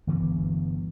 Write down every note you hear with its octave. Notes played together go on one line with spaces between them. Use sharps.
G1 D2 E3 B3